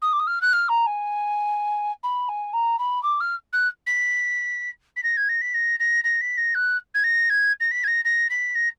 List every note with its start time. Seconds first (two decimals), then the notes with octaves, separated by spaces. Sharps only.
0.02 D#6
0.13 D6
0.19 D#6
0.27 F6
0.41 F#6
0.53 F6
0.69 A#5
0.86 G#5
2.03 B5
2.29 G#5
2.53 A#5
2.79 B5
3.03 D6
3.20 F6
3.53 F#6
3.87 B6
4.96 B6
5.03 A#6
5.17 G#6
5.29 A#6
5.41 B6
5.54 A#6
5.80 A#6
6.04 A#6
6.21 B6
6.37 A#6
6.55 F#6
6.94 G#6
7.04 A#6
7.30 G#6
7.60 A#6
7.71 B6
7.84 G#6
7.87 A#6
8.05 A#6
8.30 B6
8.55 A#6